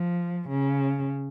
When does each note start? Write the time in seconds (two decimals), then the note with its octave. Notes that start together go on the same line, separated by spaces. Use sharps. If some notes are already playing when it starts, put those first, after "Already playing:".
Already playing: F3
0.49 C#3